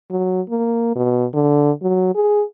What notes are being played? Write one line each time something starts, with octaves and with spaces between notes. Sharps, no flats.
F#3
A#3
B2
D3
F#3
G#4